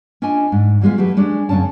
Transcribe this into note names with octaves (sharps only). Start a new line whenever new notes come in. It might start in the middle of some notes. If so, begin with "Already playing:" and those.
C#4 D4 F4 D#5 G#5
G#2
E3 G3 G#3 B3 F4
F#3 A3 G4 B4
G#3 C#4 D4
F#2 C#3 C4 C#4 A5